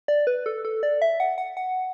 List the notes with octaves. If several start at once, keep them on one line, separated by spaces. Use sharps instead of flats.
D5
B4
A4
A4
D5
E5
F#5
F#5
F#5